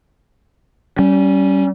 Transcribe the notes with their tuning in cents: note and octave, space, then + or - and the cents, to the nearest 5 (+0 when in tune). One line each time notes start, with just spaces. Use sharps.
G3 -25 C#4 +0